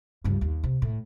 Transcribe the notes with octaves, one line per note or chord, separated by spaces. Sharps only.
C#2 G2
D#2
C3
A2